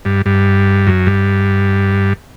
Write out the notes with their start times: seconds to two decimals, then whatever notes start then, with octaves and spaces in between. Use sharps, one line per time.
0.05 G2
0.26 G2
0.87 F#2
1.07 G2